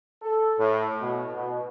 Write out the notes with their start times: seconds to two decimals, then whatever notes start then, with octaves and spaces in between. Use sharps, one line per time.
0.22 A4
0.58 A2
1.00 B2
1.34 B2